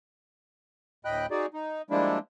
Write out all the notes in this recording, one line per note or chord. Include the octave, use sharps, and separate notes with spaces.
D2 A2 D#5 G5 B5 F#6
D#4 F#4 G#4 D5
D#4
F3 G3 G#3 A#3 D4 E4